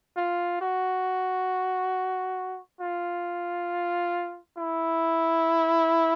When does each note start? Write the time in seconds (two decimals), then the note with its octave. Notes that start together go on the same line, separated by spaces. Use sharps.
0.17 F4
0.61 F#4
2.81 F4
4.57 E4